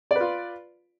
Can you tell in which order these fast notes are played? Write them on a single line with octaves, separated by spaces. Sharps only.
D5 B4 F4